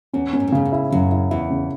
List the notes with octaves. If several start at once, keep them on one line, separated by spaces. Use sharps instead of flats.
E2 C#4
C#4
G#2
A2
G#2 C#3
G#2
E4
F#2 C#3
E4
E2 E4
C#3